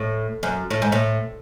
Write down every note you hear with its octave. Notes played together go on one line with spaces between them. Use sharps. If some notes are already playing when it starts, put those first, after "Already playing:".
Already playing: A2
F#2
A2
G#2
A2